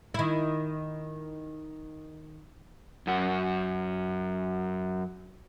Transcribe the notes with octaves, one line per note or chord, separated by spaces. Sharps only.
D#3 E4
F#2 F#4